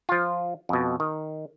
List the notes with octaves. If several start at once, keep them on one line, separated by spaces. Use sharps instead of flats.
F3 F4
F2 B2
D#3